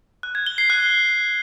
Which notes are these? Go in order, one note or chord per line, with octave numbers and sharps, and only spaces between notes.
F#6
G#6
G7
C7
F#6